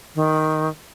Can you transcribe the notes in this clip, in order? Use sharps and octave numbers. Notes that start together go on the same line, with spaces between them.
D#3